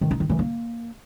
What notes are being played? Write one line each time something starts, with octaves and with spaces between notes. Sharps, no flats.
D#3
D#4
D#3
E3
A#3